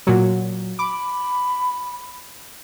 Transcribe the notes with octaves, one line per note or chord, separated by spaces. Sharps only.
A#2 F#3
B5 D6